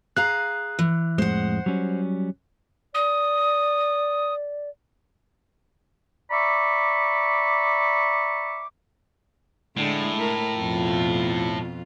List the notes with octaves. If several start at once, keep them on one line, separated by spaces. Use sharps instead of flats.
G#4 F5 A#5 F#6
E3
F2 A2 G#3 C5 F#5
F#3 G3 C#4
D5 D#6
D5 E5 A#5 B5 C#6 D6
A2 D3 G#3
A3 E4 A#4
F2 B2 F4